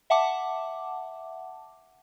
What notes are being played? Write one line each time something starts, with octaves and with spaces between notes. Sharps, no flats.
E5 F#5 A5 D6